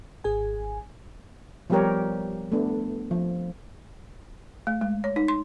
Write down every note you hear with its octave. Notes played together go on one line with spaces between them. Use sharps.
G#1 G#4 G#5
F3 G3 B3 G4 A#4 C#5
A3 B3 D4
F3
A3
G#3
C#5
D#4
C6